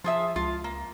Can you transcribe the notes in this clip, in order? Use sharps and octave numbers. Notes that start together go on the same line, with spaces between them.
F3 F4 G#4 E5
C#2 F4
A#3